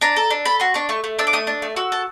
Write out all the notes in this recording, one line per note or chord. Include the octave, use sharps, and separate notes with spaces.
D4 A#5
A4
D4
A4 B5
F#4 C6
D4 C#6
A3 C#6
A3
D4 E6
D6
A3 D#6
D4
A3
F#4 E6
A4